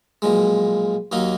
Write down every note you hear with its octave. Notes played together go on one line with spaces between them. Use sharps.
B1 A#2 F3 G#3
D#2 D#3 F#3 A#3 D#4